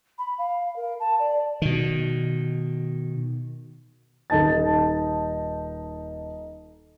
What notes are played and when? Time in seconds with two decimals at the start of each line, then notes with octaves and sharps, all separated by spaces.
0.18 B5
0.38 F5
0.76 A#4
1.00 A5
1.19 D5
1.62 B2 D#3
4.30 D#1 D#4 A5 A6